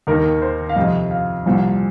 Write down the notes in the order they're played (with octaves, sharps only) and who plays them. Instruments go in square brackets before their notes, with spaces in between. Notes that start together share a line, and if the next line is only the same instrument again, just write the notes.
[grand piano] D#2 D#3 A#4
C5
F5
F2 C3 F3 D#5
F5
C2 A#2 F3